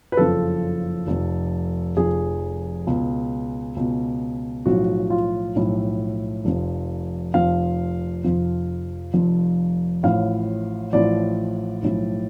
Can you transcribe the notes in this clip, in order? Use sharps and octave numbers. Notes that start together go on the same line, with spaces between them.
B4
F#1 F2 C#3 F3 A4
F1 F2 F3
F1 F2 F3 G#4
C#2 B2
C#2 B2
B1 A2 F3 F#4
F4
B1 A2 F3
F1 F2 F3
F1 F2 F3 F5
F1 F2 F3
F1 F2 F3
A1 A2 F3 F5
A1 A2 F3 D5
B1 A2 F3